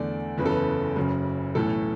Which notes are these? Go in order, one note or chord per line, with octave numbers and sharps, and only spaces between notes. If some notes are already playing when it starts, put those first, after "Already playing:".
Already playing: E2 D3 A3 D5
F#1 E2 C#3 B4
A4
B4
F#1 F#2 C#3
B1 A2 E3 A3 A4